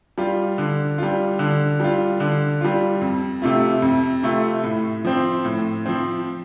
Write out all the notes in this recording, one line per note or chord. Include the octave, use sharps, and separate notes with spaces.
G3 F4
D3
G3 F4
D3
G3 F4
D3
G3 F4
F2
C3 A3 F4
F2
C3 A3 F4
A2
F3 C4
A2
F3 C4